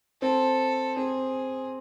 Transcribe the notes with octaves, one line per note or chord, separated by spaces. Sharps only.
C4 A4
C4 G#4